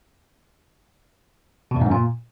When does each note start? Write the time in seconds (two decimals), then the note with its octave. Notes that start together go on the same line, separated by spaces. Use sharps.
1.71 B2
1.76 E2
1.81 G#2
1.86 F#2
1.91 A#2